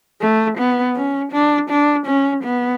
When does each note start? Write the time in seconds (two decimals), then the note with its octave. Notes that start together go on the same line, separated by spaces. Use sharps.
0.21 A3
0.58 B3
0.96 C#4
1.32 D4
1.70 D4
2.07 C#4
2.44 B3